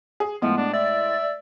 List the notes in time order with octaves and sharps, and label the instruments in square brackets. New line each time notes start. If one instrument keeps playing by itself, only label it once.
[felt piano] G#4
[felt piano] A2 G#3 [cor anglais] F3 [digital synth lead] B3
[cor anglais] D4
[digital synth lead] D5 [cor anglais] E5